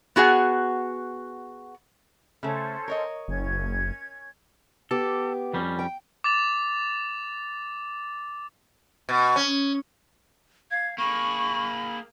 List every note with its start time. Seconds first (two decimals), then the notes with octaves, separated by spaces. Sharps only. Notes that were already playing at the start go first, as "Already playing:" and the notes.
0.16 B3 F#4 G#4 F#5
2.43 C#3 A3 C#4 A4 C5
2.88 A#4 C#5 D#5
3.28 F#1 C#4 G#6
4.91 B3 G4 A4
5.54 F2 G3 C#4
5.79 G5
6.24 D6 A6 F7
9.09 B2
9.36 C#4
10.71 F5 G#6
10.98 A#3 G#4 B5 C#6